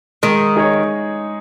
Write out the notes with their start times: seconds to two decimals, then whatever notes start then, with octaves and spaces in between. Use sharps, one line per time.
0.23 D#3 G#3
0.56 D#4 G#4 C#5